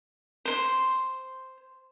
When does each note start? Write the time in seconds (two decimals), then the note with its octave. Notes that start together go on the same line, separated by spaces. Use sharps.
0.45 C5 C6